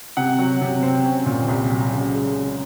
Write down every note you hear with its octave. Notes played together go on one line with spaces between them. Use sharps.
C3 F#5
F#3
C3
C4
C#4
A#2
C2
F#3
C#3
G#3
C#3